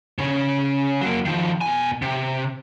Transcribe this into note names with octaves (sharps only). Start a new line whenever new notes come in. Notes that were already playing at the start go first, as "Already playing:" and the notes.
C#3 C#5
F#3 A#3
D#3 F3
B2 G#5
C3